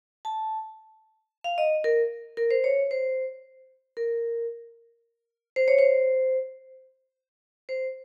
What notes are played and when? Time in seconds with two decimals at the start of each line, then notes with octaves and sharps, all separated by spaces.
0.25 A5
1.44 F5
1.58 D#5
1.84 A#4
2.37 A#4
2.51 C5
2.64 C#5
2.91 C5
3.97 A#4
5.56 C5
5.68 C#5
5.78 C5
7.69 C5